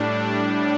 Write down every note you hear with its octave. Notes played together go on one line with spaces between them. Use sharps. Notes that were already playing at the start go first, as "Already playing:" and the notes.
Already playing: A2 G3 D4